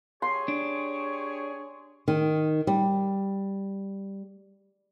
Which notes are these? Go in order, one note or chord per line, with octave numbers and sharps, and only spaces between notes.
G4 G#4 C#5 C6
D4
D#3
G3